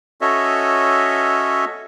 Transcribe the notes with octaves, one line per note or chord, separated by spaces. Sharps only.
C#4 F#4 A4 C#5 D#5 E5